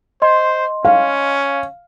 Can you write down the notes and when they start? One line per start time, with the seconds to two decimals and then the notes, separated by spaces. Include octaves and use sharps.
0.22 C5 D#5 C6
0.85 C#4 F5